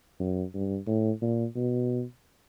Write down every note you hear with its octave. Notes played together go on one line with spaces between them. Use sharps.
F#2
G2
A2
A#2
B2